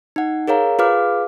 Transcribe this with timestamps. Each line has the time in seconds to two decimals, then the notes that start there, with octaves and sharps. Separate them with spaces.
0.16 D#4 F#5
0.48 G#4 A#4 C#5 F5 A#5
0.79 F4 G#4 B4 F5 D6 F6